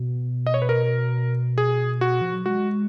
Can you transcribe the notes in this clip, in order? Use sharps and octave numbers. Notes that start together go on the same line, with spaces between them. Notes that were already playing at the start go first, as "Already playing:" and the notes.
Already playing: B2
D#5
C#5
B4
A#4
G#4
F#4
F3
F#3
G#3 F#4